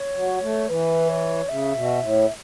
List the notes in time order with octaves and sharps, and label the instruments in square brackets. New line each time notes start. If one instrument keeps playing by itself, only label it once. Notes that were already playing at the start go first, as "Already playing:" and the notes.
Already playing: [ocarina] C#5
[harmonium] F#3
A3
[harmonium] E3 [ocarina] B4
[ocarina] C#5
[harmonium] C#3 [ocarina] E5
[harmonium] B2
A2